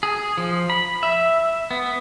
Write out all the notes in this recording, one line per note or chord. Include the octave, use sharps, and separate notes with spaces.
G#4
F3
B5
E5
B3